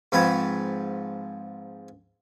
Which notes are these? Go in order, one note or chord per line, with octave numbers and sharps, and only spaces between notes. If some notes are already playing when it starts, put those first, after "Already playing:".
G#2 F3 C4 B4 C#5